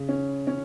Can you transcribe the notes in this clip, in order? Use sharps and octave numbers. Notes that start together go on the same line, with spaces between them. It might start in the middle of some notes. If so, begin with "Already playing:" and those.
Already playing: C#3
C#4
C#4